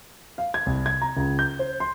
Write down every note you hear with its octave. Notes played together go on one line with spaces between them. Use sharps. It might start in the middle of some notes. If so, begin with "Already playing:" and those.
F5
G#6
C2
G#6
A#5
C#2
G6
C5
C6